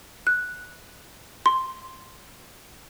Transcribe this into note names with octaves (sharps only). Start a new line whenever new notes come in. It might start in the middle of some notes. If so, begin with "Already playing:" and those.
F#6
C6